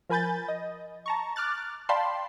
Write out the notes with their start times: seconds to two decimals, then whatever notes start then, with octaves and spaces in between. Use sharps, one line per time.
0.09 F3 A#4 G#5 B5 G6 A6
0.48 D#5
1.06 A5 A#5 C#6
1.36 D6 F6 F#6 A6
1.89 D5 F5 G5 A5 B5 C6